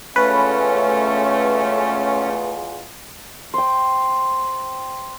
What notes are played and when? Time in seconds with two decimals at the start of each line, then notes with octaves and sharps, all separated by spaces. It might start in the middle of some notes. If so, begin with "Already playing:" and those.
0.16 E2 G#3 A3 C#4 F4 B4
3.54 C5 G5